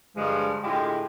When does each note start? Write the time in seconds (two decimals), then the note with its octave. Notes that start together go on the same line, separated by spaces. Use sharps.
0.17 G2 D3 F3 G#3
0.64 A2 D3 G#3 E4 F4 G4